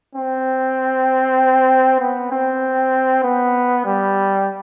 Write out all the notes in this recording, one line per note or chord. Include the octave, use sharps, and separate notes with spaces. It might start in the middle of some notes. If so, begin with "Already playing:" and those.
C4
B3
C4
B3
G3